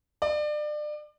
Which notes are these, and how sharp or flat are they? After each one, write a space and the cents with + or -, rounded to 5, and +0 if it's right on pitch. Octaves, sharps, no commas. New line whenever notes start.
D5 +30